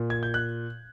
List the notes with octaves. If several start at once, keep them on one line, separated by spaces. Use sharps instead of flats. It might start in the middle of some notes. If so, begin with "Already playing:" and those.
Already playing: A#2
G#6
G6
F#6